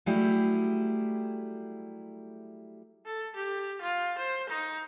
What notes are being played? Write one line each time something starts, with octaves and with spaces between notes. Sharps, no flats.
F#3 G3 A3 E4 G4 G#4
A4
G4
F4
C5
D#4